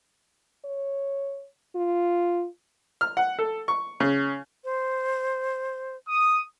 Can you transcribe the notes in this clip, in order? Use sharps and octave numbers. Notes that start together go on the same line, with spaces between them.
C#5
F4
F6
F#5
A4
C#6
C#3
C5
D#6